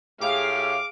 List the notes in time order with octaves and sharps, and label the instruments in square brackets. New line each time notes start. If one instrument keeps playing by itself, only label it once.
[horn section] A2 G4 [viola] G#4 [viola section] F5 [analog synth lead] D6